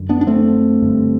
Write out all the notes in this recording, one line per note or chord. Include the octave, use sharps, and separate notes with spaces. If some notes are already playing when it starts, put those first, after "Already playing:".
Already playing: F#2 D3
B3 D4
D4
A3 C4
G2 D3